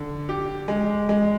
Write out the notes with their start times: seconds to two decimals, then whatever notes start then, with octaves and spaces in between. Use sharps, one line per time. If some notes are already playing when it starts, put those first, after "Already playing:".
Already playing: D3
0.29 G4
0.68 G#3
1.09 G#3